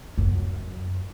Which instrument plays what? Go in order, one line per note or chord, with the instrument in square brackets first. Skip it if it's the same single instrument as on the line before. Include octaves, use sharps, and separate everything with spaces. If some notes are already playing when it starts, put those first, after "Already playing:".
[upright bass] F#2